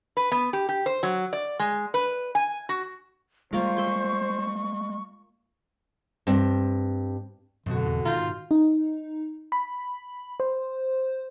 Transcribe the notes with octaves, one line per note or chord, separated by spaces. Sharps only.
B4
B3
G4
G4
C5
F#3
D5
G#3
B4
G#5
F#4
G3 G#3 A#3 F4 A#4 C5 C#6
E5 G5 G#5
G2 C4
G#1 F#2 B2 D3 F#4
E2
G#2 D#3 F4 A#5 G6
D#4
B5
C5